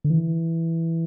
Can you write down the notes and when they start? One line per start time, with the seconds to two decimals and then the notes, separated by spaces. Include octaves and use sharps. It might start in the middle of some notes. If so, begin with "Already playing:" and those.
0.04 D3
0.10 E3